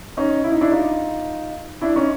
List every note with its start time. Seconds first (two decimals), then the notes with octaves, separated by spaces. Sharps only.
0.17 C#4 D#4
0.44 E4
0.52 D#4
0.61 D4 E4
0.72 D#4 F4
1.81 D4 E4
1.96 C#4 D#4